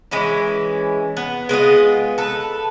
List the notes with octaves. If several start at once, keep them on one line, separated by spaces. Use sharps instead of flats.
E3 G#3 C#4 E4
B3
G#3 B3 F4 D#5
A4 B4